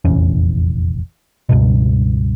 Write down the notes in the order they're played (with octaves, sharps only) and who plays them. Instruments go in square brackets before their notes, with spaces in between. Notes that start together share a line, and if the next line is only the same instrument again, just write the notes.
[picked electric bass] F1 A#1 E2 C#4
C#2 G2 B2